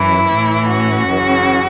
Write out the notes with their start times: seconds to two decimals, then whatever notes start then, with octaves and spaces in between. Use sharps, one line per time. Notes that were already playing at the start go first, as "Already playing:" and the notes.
Already playing: F#2 E3 E4
0.30 A2 E3
0.69 C#4 F#4
1.09 F#2 C#3 E3